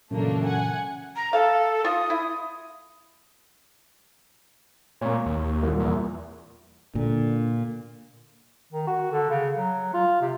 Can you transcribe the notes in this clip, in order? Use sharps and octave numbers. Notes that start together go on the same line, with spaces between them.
F#2 A#2 C#3 E3 A3 A#3 D4
F#5 G#5
A#5
A4 F5
F4 D#6
E4
A#2 A#3 C#5
D#2
C2 A#2
E2
A#2 D3
D#3
F#4
D3
C#3
F#3
F4
C3